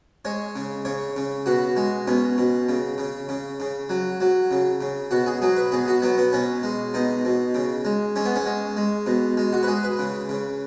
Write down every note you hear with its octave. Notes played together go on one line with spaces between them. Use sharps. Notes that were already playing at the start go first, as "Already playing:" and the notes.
G#3 C#5
C#3
C#3 C#5
C#3
B2 F#4
G#3
B2 C#4
B2
C#3
C#3
C#3
C#3
F#3
F#3
C#3
C#3
B2 F#4
G#4
F#3 G#4
B4
B2 G#4
F#4
F#3 B3
B3
B2 C#4
G#3
B2 D#4
B2
C#3
G#3
G#3 C#4
B3
C#4
G#3
G#3
B2
G#3
F#4
B4
G#3 G#4
B4
C#3
C#3